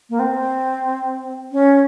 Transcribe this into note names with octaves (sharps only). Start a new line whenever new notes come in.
A#3
C4
C#4